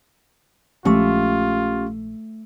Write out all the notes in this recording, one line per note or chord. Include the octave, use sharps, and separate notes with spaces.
A#1 F3 G#3 A3 C#4 F4 G4 C#6